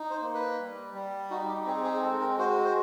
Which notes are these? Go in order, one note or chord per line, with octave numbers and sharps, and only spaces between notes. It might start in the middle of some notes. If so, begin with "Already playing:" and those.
Already playing: D#4
C5
A#3
B4
G3
G3
D#4 F#4
G4
C4 G#4
G#4
G#3 A4
A#4
F#4 C5
C5